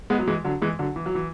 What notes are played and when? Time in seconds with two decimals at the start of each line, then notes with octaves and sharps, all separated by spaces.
0.10 G#3 B3
0.19 F#3
0.27 E3 G#3
0.44 D3 F#3
0.62 E3 G#3
0.79 D3 F#3
0.96 E3
1.06 F#3
1.15 E3